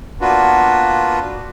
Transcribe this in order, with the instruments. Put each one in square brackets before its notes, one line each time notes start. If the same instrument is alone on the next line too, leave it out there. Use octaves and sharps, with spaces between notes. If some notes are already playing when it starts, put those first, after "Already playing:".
[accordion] A#3 B3 D4 F4 F#4 B4